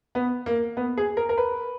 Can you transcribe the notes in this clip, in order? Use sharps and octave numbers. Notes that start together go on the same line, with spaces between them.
B3
A#3
B3
G#4
A#4
A#4
B4